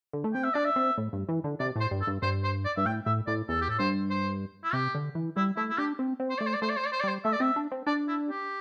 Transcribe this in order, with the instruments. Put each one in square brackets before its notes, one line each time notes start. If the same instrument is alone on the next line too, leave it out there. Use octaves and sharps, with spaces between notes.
[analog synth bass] D3
A3
[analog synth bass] C4 [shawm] G5
[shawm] E5
[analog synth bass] D4 [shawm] D5
[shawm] E5
[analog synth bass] C4
A2
G2
E3
D3
[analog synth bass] C3 [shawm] D5
[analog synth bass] A2 [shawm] C5
[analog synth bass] G2
[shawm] A4
[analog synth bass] G2
[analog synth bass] G2 [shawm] C5
[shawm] C5
D5
[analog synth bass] G2 [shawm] E5
[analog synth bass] A2 [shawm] G5
[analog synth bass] A2 [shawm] E5
[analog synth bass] A2 [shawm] D5
[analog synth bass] E2 [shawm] A4
[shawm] G4
[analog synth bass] A2 [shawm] A4
[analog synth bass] G2 [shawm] C5
[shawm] C5
E4
[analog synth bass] C3 [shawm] G4
[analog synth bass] D3
E3
[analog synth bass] G3 [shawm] E4
[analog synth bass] A3 [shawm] E4
[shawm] E4
[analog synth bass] D4 [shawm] G4
[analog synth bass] C4
C4
[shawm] C5
[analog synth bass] A3 [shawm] D5
[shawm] C5
D5
[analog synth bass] A3 [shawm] C5
[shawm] D5
C5
D5
C5
D5
[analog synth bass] G3 [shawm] C5
[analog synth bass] A3 [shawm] E5
[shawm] D5
[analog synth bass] C4 [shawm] E5
[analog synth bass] D4
C4
[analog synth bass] D4 [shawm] D5
[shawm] E4
G4